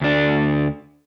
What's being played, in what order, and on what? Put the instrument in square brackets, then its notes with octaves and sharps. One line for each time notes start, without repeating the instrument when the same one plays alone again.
[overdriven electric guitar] D2 D4